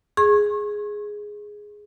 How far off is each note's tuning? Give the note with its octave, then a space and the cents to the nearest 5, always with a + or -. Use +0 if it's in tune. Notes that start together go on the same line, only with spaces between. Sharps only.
G#4 +0 C#6 -35